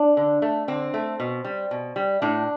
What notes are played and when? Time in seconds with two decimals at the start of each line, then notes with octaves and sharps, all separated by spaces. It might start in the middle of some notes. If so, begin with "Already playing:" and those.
Already playing: D4
0.17 D3
0.42 A3
0.68 D3 C4
0.94 A3
1.20 B2
1.44 G3
1.71 B2
1.96 G3
2.22 A2 D4